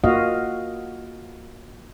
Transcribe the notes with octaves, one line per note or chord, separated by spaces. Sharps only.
A#3 F4 F#4 D#5 F5